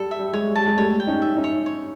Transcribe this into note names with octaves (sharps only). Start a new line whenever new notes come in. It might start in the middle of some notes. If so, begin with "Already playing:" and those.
Already playing: G3 A4
E5
G3
G#3 C#5
G3 A5
G#3
G3 A3 C#5
G5
C#4 D#4
E5
C#4 D#4
C#5
C#5